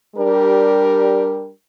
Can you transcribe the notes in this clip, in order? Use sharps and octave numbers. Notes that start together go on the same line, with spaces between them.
G3 D4 G4 A#4